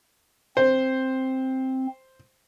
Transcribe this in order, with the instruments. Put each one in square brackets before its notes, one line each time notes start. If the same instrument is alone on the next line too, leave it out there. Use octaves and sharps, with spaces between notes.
[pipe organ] C4 [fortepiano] C5